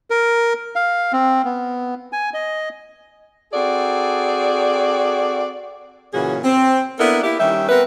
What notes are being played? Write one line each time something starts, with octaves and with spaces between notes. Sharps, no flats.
A#4
F5
C4
B3
G#5
D#5
C4 F#4 G#4 A4 D5
A#2 C#3 E3 C#4 F#4 G#4
C4
A#3 B3 D4 E4 A4 A#4
A#3 E4 G4
D#3 G3 C#4 G4 E5
B3 C4 A#4 B4